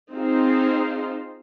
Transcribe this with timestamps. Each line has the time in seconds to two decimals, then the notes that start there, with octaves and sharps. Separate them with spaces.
0.14 C4 D#4 F4 G#4 C5